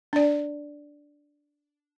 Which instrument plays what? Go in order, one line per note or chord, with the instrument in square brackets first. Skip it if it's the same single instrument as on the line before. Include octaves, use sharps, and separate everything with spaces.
[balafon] D4 D5